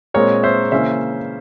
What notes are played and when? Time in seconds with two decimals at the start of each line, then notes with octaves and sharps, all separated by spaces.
0.14 A#2 G#3 C4 A#4 C#5
0.43 C5 E5
0.72 C#3 E3 A#3 C#4 C5 E5